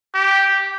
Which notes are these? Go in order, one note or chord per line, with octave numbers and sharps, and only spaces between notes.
G4